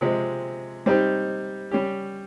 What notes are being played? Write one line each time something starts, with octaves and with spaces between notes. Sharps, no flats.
C3 F3 G#3 C4
G3 C4 D#4 G4
G3 C#4 G4